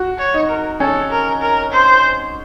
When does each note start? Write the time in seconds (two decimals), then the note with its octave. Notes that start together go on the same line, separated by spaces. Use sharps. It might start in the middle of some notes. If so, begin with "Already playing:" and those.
Already playing: F#4
0.19 C#5
0.34 D#4
0.49 A#4
0.80 C#4 A4
1.10 A#4
1.41 A#4
1.72 C5